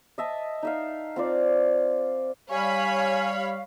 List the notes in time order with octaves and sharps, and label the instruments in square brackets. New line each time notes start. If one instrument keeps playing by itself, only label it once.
[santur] D#5 E5 A5
D#4 E5 F5
C4 F4 D5
[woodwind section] G3 F5 [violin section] C#5 B5 [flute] G#5